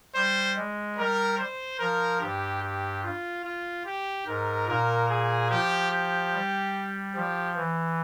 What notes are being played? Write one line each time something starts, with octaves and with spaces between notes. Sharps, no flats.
G3 C5
G#3
G3 A#4
C5
F3 A#4
G2 G4
G4
F4
F4
G4
G#2 A#4
A#2 A#4
G#4
F3 G4
G4
G3
F3 G4
E3